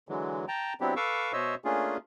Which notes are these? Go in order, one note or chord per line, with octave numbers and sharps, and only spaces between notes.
D3 E3 F#3 G#3
G5 A5 A#5
F#3 B3 C4 D4 E4 G4
A4 B4 F5 C#6 D6 E6
B2 C5 C#5 D#5 E5 E6
A3 A#3 C#4 D4 F4 G#4